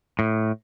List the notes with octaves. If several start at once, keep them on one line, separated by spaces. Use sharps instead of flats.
A2